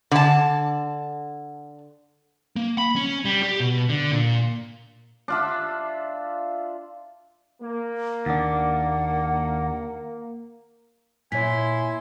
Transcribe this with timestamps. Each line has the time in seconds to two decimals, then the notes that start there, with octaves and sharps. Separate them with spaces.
0.11 D3 A5
2.56 A#3
2.78 B5
2.96 C#4
3.25 G3
3.43 G4
3.59 B2
3.89 D3
4.11 A#2
5.28 D4 F4 E5
7.61 A#3
8.26 D#2 D4 F#5
11.32 A#2 E4 C#5 G#5 C6 B6